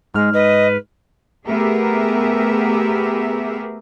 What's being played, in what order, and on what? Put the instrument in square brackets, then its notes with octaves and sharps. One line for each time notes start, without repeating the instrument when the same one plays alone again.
[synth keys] G#2 F6 [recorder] G#3
[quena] B4 [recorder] D#5
[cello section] A3 B3 G4 G#4 A#4 E5